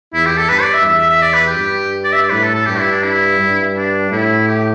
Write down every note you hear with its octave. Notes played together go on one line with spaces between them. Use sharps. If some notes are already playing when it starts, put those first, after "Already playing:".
E2 E4
G4
A4
G2 B4
D5
E5
E2 E5
E5
E5
D5
B4
G4
G2
D5
E5
D5
A2 B4
A4
A4
G2 G4
E4
D4
E4
G2
D4
A2 E4
G4